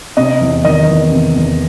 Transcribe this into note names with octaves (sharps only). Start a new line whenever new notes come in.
C3 D#5
E2
D#3 D#5
E2
C3
E2